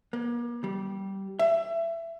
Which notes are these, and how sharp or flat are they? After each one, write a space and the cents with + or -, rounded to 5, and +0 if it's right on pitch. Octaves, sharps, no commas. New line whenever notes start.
A#3 +40
G3 -15
E5 +20